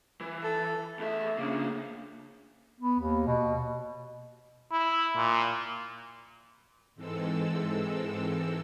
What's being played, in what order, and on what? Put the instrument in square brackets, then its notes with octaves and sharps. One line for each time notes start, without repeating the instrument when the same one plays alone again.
[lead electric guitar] E3
[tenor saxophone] A4
[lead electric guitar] E2 E5 [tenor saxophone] A3
[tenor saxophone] C#3 [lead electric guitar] A#3 D4
[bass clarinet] B3
D#2
B2
[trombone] E4
A#2
[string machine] G#2 E3 G#3 C4 A4 E6